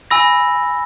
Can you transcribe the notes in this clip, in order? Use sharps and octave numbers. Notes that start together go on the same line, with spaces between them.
G#5 B5 E6 A#6